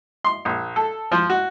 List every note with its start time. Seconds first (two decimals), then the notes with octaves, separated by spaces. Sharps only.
0.24 C6
0.45 A#1
0.76 A4
1.12 F3
1.30 F#4